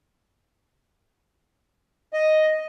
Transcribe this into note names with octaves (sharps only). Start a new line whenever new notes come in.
D#5